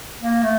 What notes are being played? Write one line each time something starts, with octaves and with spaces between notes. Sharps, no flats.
A#3
A3